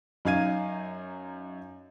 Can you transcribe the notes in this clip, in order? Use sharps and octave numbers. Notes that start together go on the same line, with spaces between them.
F#2 D#4 F5 G#6 D#7